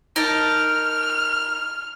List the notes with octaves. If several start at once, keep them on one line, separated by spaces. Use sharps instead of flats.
D#4 A#4 A5 F6